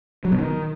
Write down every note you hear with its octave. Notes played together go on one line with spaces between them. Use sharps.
F#3
B2
D#3